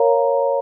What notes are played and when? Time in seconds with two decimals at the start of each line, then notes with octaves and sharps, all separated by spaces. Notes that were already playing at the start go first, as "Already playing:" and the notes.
Already playing: A#4 C#5 F5 A#5